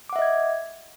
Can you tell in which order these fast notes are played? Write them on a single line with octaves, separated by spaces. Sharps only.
D6 F#5 E5 D#5 G#6